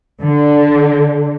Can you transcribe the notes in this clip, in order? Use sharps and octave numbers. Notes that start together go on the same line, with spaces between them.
D3